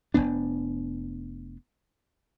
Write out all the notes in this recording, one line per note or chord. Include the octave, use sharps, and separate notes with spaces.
F1 A2 B3 D4